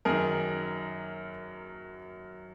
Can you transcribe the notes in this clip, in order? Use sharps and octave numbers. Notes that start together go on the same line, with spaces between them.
F#2 D#3 G#4 A#4